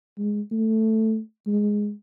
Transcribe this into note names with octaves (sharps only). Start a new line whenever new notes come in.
G#3
A3
G#3